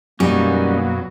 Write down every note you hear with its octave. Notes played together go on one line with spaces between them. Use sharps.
F#2 B2 F#3 G3 A#3 C#4 D#4